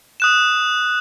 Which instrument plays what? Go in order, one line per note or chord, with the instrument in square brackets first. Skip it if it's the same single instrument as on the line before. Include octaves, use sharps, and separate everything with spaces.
[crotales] D#6 F#6 E7